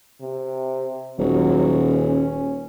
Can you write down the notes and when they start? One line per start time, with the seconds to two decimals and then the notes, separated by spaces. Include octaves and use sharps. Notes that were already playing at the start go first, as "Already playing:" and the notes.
0.21 C3
1.19 D#1 F#3
1.90 C#4